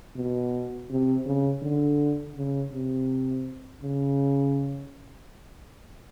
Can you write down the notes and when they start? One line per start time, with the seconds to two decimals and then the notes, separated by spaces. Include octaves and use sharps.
0.16 B2
0.90 C3
1.26 C#3
1.62 D3
2.36 C#3
2.73 C3
3.83 C#3